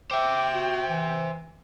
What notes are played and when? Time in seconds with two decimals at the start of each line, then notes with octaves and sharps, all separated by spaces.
0.11 C5 E5 G5 D6
0.53 F#4
0.89 E3